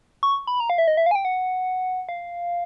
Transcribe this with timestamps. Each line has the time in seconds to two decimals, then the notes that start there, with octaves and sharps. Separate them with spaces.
0.23 C#6
0.47 B5
0.60 A#5
0.70 F5
0.78 E5
0.88 D#5
0.97 E5
1.06 F5
1.11 G#5
1.15 G5
1.25 F#5
2.09 F5